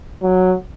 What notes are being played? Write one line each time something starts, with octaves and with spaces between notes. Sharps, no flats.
F#3